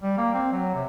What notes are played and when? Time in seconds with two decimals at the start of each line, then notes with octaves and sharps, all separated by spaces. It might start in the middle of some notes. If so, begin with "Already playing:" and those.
0.03 G3
0.18 A#3
0.34 C4
0.52 F#3
0.74 C3